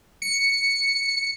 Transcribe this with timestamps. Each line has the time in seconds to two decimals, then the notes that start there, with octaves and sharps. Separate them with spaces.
0.22 C#7